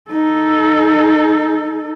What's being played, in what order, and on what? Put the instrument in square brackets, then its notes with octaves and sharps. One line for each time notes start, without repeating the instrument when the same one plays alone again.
[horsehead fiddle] D#4 A4